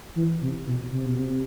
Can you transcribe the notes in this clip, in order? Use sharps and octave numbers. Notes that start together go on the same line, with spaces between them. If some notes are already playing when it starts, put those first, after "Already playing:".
E3
C3
B2
C3
B2
C3